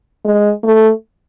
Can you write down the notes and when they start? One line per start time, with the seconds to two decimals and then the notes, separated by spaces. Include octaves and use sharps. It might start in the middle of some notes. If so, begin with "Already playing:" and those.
0.25 G#3
0.63 A3